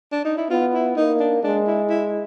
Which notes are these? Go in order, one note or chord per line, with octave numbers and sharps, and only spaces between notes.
D4
D#4
E4
B3 F4
E4
A#3 D#4
D4
G#3 D4
E4
E4